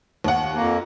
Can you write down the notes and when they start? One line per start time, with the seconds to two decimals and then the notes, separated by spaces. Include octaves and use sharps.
0.24 D#2 F#5
0.55 F2 A#3